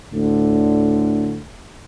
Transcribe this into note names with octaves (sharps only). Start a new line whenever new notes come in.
D2 A2 D3